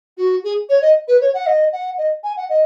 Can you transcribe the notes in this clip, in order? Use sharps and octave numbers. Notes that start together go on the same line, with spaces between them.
F#4
G#4
C#5
D#5
B4
C#5
F#5
D#5
F#5
D#5
G#5
F#5
D#5